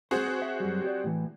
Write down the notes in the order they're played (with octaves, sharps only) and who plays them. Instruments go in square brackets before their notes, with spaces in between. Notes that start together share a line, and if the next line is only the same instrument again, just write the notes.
[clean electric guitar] G#3 C5 [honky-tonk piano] C4 F#4 G#4
[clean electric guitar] C5
E5
F#2 G3
G4 C#5 D5
A2 E3